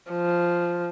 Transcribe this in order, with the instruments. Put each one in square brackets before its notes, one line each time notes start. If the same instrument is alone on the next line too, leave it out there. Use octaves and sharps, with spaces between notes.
[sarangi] F3